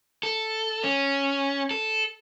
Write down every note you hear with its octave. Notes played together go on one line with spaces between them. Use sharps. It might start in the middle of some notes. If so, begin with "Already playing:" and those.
A4
C#4
A4